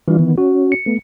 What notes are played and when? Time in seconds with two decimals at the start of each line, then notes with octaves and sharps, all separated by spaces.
0.08 E3 G3 D4 F4
0.19 D#3 B3
0.38 C#4 F#4
0.72 C#7
0.86 A3 B3